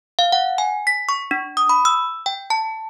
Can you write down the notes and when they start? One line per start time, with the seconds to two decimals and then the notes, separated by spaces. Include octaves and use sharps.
0.19 F5
0.32 F#5
0.58 G#5
0.87 B6
1.09 C#6
1.31 D4
1.57 D#6
1.69 B5
1.85 E6
2.26 G5
2.50 A5